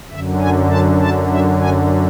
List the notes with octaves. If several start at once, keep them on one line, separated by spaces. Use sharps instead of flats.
F#2 D3 E5
G#5
A5
A5
E5
G#5